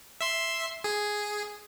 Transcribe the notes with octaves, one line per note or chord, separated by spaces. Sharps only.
E5 C6
G#4